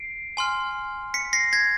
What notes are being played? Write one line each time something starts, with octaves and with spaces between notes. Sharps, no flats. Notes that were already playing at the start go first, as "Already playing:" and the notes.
Already playing: C7 D7
G#5 C6 F6
B6 C#7
A#6 C7
G#6 A#6